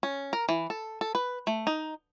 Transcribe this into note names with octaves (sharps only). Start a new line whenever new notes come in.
C#4
A#4
E3
A4
A4
B4
A3
D#4